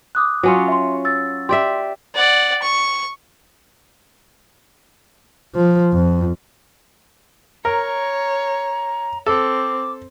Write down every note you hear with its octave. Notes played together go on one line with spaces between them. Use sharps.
D6 D#6 F#6
F#3 C#4 F4
E5 C6
E6 A6
G4 D5 E5 C6
D5 F#5
C#6
F3
F2
A#4 C#5 A#5
C4 A4 D6